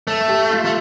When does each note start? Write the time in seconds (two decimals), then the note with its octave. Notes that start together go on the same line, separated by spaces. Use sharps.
0.07 A3 A4
0.28 G4
0.50 F4
0.65 A3